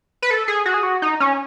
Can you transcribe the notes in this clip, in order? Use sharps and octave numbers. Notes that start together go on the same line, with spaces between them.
B4
A4
G#4
F#4
G#4
F#4
D#4
C#4